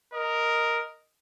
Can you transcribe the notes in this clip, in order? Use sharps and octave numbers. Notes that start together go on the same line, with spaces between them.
A#4 D#5